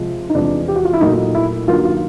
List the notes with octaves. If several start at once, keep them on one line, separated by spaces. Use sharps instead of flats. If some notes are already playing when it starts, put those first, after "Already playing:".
Already playing: C3 F3 G#3
D#4
E2 C3 F3 G#3 D4
G4
F#4
F4
E4
A#2 F#3 A3 D#4
E4
G2 D#3 F#3 A#3 F4
F4